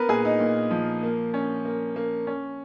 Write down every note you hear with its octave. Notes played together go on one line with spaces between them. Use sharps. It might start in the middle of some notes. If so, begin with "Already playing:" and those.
Already playing: B3 A#4 B4
A#2 G#4
D#4
A#2
F3
A#3
C#4
A#3
A#3
C#4